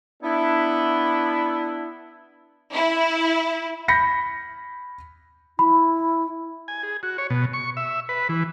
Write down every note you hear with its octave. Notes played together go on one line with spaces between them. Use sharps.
B3 D4 E4
E4
B5 G6 A#6 B6 C#7
E4 B5
G#5
G#4
F#4
C#5
B2
C#6
E5
B4
E3